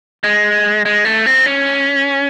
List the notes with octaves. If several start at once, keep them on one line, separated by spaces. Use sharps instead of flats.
G#3
G#3
A3
C4
C#4